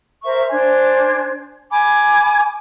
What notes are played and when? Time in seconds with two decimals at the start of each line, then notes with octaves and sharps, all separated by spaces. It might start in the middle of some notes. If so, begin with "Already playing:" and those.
0.23 A#4 C5 E5 C#6
0.50 D4 C5 G#5 G#6
1.71 G#5 B5 D6